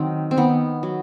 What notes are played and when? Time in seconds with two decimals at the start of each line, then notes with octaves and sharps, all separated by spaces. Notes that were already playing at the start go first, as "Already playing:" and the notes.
Already playing: D#3 F#3 C4
0.31 C4
0.37 D#3 B3
0.83 F#3